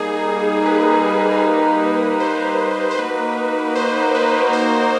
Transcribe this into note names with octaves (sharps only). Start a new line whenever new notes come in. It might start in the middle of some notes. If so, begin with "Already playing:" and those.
Already playing: G3 A#3 D#4 G#4
B4
C5
C5
A#3 D#4 F#4 A#4 B4
C5
B4
C5